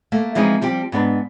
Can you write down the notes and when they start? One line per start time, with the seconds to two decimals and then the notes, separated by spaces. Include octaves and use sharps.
0.12 A3 A#3
0.35 E3 F3 G#3 C4 D#4
0.61 F3 G3 C4 G4
0.92 G#2 B3 D4 B4